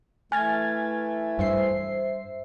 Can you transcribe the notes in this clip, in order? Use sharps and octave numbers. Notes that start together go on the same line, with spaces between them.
E3 A3 G#5 F6 G#6 A6
G2 C5 E5 C7